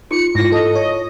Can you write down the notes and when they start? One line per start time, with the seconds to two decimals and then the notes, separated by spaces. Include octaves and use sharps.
0.11 D#4 F4 C#7
0.35 G#2 E4 F4 A#6
0.52 A4 D#5
0.76 C#5